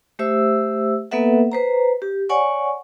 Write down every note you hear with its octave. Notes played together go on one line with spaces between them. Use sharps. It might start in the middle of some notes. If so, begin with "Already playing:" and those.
A3 G4 C5 E5 E6
A#3 B3 A4 B4 E5 F#5
B4 C5 A#5
G4
C#5 D5 F#5 G#5 C#6